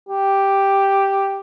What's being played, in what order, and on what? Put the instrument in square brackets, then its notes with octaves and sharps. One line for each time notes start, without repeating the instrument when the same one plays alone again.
[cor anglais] G4